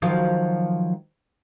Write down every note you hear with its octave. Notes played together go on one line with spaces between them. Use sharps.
D#3 F3 F#3